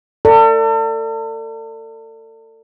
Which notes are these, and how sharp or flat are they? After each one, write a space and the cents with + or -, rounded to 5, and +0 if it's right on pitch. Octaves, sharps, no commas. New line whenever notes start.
A4 +40 D5 +0